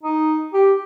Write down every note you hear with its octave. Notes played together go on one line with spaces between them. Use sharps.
D#4
G4